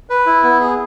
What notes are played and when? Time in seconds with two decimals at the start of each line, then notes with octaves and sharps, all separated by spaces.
0.10 B4
0.26 E4
0.43 B3
0.60 G#4